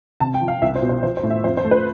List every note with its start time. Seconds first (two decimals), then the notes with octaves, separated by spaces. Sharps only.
0.20 C3 A5
0.34 G5
0.41 F3
0.48 F5
0.62 C2 E5
0.76 C5
0.82 B2
0.89 C5
1.03 F3 C5
1.17 C5
1.23 A2
1.30 E5
1.44 F2 C5
1.57 C5
1.64 A3
1.71 B4